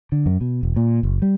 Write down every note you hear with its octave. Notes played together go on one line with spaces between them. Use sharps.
D3
F#2
B2
E1
A#2
F#1
G3